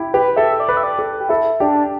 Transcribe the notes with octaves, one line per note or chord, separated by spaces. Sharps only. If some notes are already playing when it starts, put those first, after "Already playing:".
Already playing: E4 G4
G4 B4
A4 E5
D5
B4
E5
D5
A4
G4
E4 A4
D4 G4